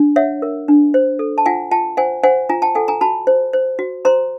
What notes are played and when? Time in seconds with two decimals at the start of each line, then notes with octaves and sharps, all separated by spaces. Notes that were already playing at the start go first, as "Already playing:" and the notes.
Already playing: D4
0.16 C#5 E5 F#5
0.42 A#4
0.68 D4
0.94 C5
1.19 A4
1.38 A5
1.46 F4 F#5 G#5
1.71 F4 G5 A5
1.97 C5 F#5 G#5
2.23 C5 F#5 G#5
2.49 F4 G#5 A#5
2.62 G5 A5
2.75 A4 F#5 G#5
2.88 G#5 A#5
3.01 F#4 A5 B5
3.27 C5
3.53 C5
3.79 F#4
4.05 C5 A#5 C6